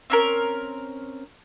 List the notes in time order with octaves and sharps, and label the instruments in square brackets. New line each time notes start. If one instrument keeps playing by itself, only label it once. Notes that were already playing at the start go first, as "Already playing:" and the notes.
[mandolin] C4 C#4 A#4